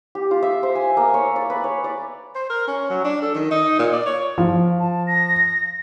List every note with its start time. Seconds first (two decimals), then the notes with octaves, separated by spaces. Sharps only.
0.15 G4
0.31 F4
0.43 E5
0.63 C5
0.75 G#5
0.97 A#3
1.14 C#5
1.36 D5
1.50 B4
1.64 C#5
1.84 D5
2.35 C5
2.50 A#4
2.68 C#4
2.90 F#3
3.05 D4
3.22 A4
3.34 D#3
3.51 D#4
3.79 A#2
3.92 D5
4.06 C#5
4.38 F3
4.79 A5
5.07 A#6